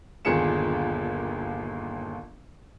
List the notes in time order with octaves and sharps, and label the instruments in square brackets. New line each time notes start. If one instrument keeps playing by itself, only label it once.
[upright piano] G1 D#2 A#2 G#4 C#7 E7